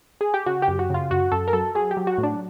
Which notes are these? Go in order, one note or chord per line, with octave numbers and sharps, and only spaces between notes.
G#4
G4
C#3 F#4
G4
F#2
F#4
C#3 F4
F#2 F#4
F#2 A4
A#4
F#3 A4
F#3 G#4
G4
F#3
F#4
A2
D4